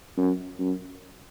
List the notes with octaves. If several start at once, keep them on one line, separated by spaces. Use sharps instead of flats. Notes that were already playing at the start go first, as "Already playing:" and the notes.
F#2
F#2